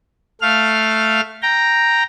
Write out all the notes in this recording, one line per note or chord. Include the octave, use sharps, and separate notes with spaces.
A3 F5 F6
G5 A#5